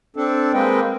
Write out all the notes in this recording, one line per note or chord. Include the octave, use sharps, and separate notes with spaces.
C4 D4 A4
G#3 A#3 C4 B4 D#5 G5